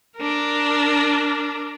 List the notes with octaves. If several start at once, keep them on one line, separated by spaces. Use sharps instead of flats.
D4 A#4